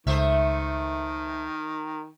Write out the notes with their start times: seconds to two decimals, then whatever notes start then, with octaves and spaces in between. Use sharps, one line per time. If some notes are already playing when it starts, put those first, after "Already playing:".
0.07 C#2 D#3 A3 C5 E5